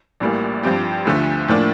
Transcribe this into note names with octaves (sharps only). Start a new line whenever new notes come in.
A#1 A2 E3 G3 A#3
G2 F3 C4 G4
D2 D3 F3 A3
A2 F3 A#3 D4